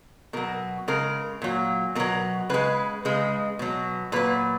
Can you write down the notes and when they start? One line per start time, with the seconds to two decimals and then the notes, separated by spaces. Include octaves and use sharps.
0.33 B2 F#3 A#4
0.88 C#3 G#3 A#4
1.42 A#2 F#3
1.95 B2 F#3 A#4
2.49 C#3 G#3 B4
3.05 C#3 G#3
3.59 B2 F#3
4.12 A#2 F#3 B4